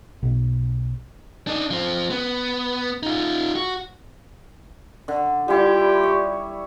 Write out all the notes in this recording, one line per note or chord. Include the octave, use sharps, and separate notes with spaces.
B1
D4 D#4
F3 C4
B3
D#4 F4
F#4
D3
G3 E4 F4 G4 D5
C#5